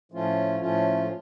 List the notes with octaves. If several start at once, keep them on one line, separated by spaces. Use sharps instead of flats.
A2 F3 A3 C#4 F4
A2 F3 A3 C#4 F4